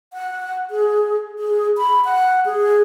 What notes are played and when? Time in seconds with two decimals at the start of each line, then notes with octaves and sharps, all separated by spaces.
0.13 F#5
0.71 G#4
1.39 G#4
1.78 B5
2.05 F#5
2.46 G#4